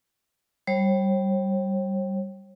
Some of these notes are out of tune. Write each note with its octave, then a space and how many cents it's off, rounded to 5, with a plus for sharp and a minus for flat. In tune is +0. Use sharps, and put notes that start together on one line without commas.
G3 -15 C#5 -45